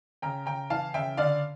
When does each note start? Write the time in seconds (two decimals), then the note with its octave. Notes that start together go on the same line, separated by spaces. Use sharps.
0.22 C#3 G5 A#5
0.46 C#3 G5 A#5
0.70 E3 F5 A5
0.94 C#3 E5 G5
1.17 D3 D5 F5